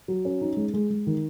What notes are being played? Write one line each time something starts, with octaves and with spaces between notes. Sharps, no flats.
F#3
C#4
D#4
G#3
G#3
G#3
D#3